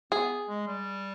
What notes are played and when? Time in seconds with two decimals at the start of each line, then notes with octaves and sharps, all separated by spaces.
0.12 B3 G#4
0.49 G#3
0.67 G3